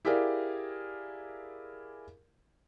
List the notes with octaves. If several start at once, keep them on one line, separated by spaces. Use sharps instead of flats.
E4 G4 G#4 A#4 D5 F5